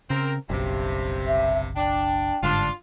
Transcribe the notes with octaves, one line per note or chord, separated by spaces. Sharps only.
C#3 C4 A#4
F#1 B1 G2 C3
E5
D4 G5
G1 G#2 D3 D4 F4